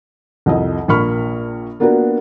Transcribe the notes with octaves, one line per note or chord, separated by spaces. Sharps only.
C2 F2 D#5
A#1 A#3 B5 C#6 F6
A#3 B3 D4 F4 F#4 A#4